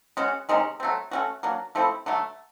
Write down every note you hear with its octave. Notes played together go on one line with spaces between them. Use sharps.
G#3 C#4 F#4
C3 D#3 G#3 C#4
F#3 A3 C4
A3 C#4 F#4
F#3 A#3 D4
F3 A3 C4 E4
D3 F#3 A3